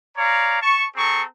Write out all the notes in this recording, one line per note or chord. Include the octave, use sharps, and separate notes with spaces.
C#5 D5 F5 A#5
A5 C#6
C4 G#4 A4 A#5 C#6